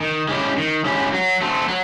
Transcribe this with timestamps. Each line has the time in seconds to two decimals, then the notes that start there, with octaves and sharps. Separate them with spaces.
0.01 D#3
0.29 G#3 C#4 E4 G4
0.57 D#3
0.85 G#3 C#4 E4 G4
1.13 F#3
1.41 A3 C4
1.69 F#3